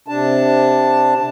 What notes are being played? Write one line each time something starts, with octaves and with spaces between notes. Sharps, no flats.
C3 D4 A5